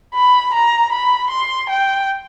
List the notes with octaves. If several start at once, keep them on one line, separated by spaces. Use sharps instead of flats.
B5
A#5
B5
C6
G5